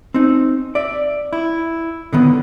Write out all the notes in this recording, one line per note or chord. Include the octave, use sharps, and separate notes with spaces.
C4 D#4
D5 E5
E4
D3 D#3 B3